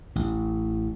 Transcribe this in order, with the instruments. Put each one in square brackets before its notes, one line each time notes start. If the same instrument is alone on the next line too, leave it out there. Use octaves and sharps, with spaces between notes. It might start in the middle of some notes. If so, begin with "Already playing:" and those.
[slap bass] A1